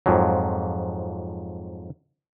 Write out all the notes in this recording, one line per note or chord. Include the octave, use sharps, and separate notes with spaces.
F2 G#2 F3 F#3